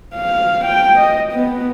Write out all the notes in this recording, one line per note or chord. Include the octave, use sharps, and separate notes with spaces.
F5
G5
D#5
B3